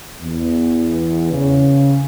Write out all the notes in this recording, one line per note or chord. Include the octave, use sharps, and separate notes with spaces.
E2
C#3